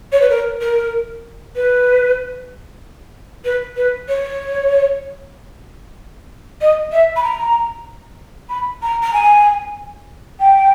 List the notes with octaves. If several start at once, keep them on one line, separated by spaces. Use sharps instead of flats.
C#5
B4
A#4
A#4
B4
B4
B4
C#5
D#5
E5
B5
A#5
B5
A#5
A#5
G#5
G5